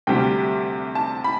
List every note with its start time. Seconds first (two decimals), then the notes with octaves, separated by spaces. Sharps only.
0.07 D2 C3 G3 G5
0.95 A5
1.24 B5